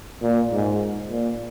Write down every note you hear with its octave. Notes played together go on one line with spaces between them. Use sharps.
A#2
G#2
A#2